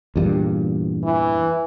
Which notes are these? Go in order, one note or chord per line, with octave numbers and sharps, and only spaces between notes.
E2 G2 A#2
E3